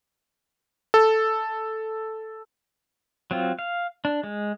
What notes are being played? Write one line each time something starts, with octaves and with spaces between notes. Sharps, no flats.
A4
F#3 C4 F4
F5
D4
G#3